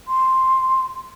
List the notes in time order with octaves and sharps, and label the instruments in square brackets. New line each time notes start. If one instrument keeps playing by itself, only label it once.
[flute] C6